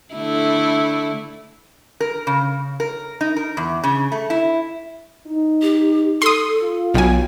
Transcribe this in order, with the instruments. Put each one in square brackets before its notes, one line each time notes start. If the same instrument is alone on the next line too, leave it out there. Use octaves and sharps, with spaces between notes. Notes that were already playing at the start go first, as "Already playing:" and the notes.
[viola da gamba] D3 A3 E4
[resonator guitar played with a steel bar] A#4
C#3
A#4
D#4
A#4
E2
C#3
A3
E4
[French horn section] D#4
[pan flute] G4
[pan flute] A4 [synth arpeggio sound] C6 D#6
[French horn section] F4
[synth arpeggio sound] B1 G#5 [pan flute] G5